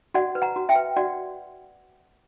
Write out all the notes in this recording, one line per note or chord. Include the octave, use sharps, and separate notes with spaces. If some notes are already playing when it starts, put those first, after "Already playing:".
F#4 D5 F#5
B4
F#5 A#5
F#4
E5 G5
B4
F#4 D5 F#5